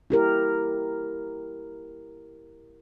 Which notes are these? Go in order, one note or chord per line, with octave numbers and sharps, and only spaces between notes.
E4 G4 A#4